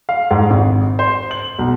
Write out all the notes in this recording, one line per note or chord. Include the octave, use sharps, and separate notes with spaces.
F5
G#2
G#1
C5
F#7
B1